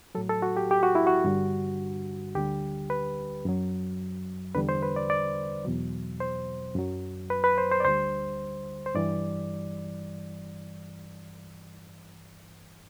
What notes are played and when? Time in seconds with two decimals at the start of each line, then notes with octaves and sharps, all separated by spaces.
0.15 A2 F#3 A4
0.30 A4
0.42 F#4
0.57 G4
0.71 G4
0.83 F#4
0.95 E4
1.07 F#4
1.25 G2 D3 G3
2.35 D2 D3 G3 G4
2.90 B4
3.45 F#2 F#3
4.55 E2 D3 G3 B4
4.69 C5
4.83 B4
4.96 D5
5.10 D5
5.65 E2 B2 F#3
6.20 C5
6.75 F#2 F#3
7.30 B4
7.44 B4
7.58 C5
7.71 C5
7.80 D5
7.85 D2 D3 G3 C5
8.86 C5
8.95 G2 E3 G3 D5